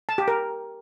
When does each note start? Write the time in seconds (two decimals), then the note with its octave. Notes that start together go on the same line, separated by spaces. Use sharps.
0.09 A5
0.18 G4
0.28 A#4